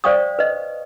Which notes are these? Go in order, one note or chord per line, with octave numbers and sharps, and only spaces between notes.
C5 D5 F5 G5 C#6 D#6
B4 D#5